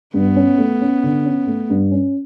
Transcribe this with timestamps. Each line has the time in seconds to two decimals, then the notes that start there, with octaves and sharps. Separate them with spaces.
0.14 G2 B3
0.36 C#4
0.58 A3
0.81 C#4
1.03 D3
1.25 C#4
1.47 A3
1.70 G2
1.91 C#4